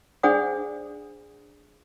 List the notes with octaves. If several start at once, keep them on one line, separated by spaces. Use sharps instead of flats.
D4 G#4 C5 D5 F#5 D#6